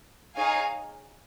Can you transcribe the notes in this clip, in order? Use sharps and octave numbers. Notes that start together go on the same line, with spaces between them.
D#4 G#4 C#5 F5 G#5